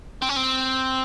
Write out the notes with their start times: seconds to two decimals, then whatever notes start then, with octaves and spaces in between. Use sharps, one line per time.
0.22 C4
0.29 C#4
0.36 C4